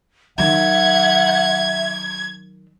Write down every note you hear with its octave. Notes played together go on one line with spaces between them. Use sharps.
D#3 F#3 E5 F#5 G#6